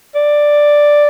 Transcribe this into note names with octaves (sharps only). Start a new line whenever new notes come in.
D5